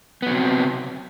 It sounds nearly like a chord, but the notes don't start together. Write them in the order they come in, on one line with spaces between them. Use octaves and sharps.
B3 F#3 C3